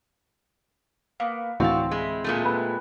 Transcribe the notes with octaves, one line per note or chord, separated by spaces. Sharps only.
A#3 B3
D2 A2 E3 C4 D4 F#4 F5 A5
G#3 E4
A#2 G#3 A3
B4